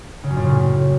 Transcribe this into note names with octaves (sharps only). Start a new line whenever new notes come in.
C#3
F#2
A#2
C#3
A2